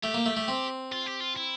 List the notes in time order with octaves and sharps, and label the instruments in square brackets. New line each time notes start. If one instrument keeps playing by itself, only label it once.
[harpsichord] A3 [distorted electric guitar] G4
[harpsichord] A#3
A3
A3
C4
[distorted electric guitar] F4
G4
F4
E4